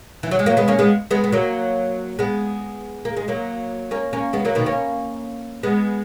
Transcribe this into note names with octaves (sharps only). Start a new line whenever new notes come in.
E3
F#3
G#3
F#3 A#3
G#3 B3
A#3 C#4
G#3 B3
G#3 B3
B3
F#3 A#3
G#3 B3
A#3
G#3
F#3 A#3
A#3 C#4
A#3 C#4
G#3 B3
F#3 A#3
B2 D#3
A#3 C#4
G#3 B3